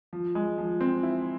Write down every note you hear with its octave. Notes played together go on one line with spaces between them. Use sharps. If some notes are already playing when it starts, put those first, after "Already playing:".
F3
G#3
F3
C4
E4